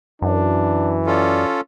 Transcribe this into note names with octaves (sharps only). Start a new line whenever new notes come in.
F#2 E3 D4
C#4 F4 A4 D5